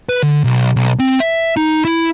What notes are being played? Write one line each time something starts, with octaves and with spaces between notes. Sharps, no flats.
B4
D3
B1
B1
C4
E5
D#4
E4